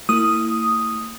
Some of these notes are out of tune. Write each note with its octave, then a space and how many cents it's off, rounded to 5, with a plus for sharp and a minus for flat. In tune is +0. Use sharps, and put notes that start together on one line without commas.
A#3 -35 E4 +0 D#6 +0